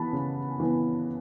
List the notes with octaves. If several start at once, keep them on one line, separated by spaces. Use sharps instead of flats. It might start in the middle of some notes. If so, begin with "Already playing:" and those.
Already playing: E3 B3 A5 B5
C#3
E3 B3